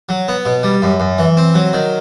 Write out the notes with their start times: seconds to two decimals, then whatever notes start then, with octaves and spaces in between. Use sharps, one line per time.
0.09 F#3
0.28 B3
0.45 B2
0.63 G3
0.82 F#2
1.00 F#2
1.19 E3
1.37 C4
1.55 F#3
1.73 D#3